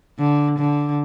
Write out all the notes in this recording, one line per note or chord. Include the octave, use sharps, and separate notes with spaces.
D3
D3